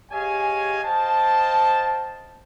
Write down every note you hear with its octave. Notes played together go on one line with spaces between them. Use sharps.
G4 G#4 C#5 D#5 F5 G#5
C5 D#5 F5 G5 A5